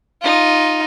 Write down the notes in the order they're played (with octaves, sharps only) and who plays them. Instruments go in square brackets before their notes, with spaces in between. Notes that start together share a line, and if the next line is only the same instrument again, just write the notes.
[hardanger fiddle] D#4 F4